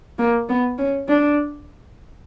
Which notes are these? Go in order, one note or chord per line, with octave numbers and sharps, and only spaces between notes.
A#3
B3
C#4
D4